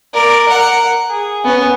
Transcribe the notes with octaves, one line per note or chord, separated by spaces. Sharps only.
A#4 D5
A#4 F#5
G#4
B3 C#4